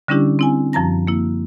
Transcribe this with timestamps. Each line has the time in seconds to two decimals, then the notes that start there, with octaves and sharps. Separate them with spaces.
0.08 D3 G3 C#4 D4 E4 G4
0.39 C4 E4 G#5
0.73 F#2 F3 A5 A#5 A#6
1.07 A#3 E4